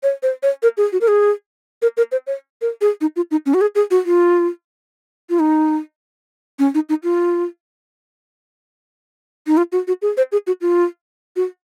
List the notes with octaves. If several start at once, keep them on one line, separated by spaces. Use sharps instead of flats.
C#5
C5
C#5
A#4
G#4
F#4
A#4
G#4
A#4
A#4
C5
C#5
A#4
G#4
D#4
F4
D#4
C#4
F#4
G#4
G#4
F#4
F4
F4
D#4
C#4
D#4
D#4
F4
D#4
F4
F#4
F#4
G#4
C5
G#4
F#4
F4
F#4